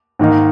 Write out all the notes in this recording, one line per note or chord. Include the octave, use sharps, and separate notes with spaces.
G#2 D#3 A#3 D#4